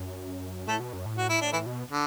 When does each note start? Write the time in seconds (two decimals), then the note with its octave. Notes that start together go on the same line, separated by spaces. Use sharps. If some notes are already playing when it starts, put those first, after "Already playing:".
Already playing: F#2
0.67 A2 A3 A4
0.80 B2
0.93 F#2
1.06 A2
1.18 F#4
1.30 E4
1.41 D4
1.53 E3 E4
1.66 B2
1.91 D3